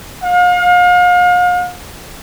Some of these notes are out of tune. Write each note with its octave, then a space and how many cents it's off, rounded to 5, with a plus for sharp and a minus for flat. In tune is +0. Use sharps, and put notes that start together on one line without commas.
F5 +40